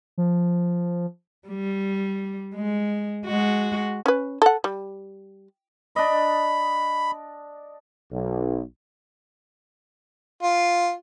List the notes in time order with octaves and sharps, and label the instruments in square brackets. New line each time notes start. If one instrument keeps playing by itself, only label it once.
[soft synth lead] F3
[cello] G3
G#3
G#3 F#4
[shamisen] C#4 B4
A4 F#5
G3
[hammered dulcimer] D4 D#5 [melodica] B5
[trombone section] B1
[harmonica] F4